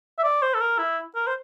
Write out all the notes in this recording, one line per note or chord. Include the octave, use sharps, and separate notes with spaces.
E5
D5
C5
A4
A#4
E4
A#4
C5